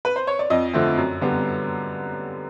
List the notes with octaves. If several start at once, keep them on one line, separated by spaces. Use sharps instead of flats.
B4
C5
C#5
D5
F2 D#5
D3 F3 A3 C4
F#2
D3 G3 B3